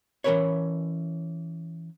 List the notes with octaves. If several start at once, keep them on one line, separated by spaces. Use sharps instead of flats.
E3 C#4 D#4 A#4 B4 C#5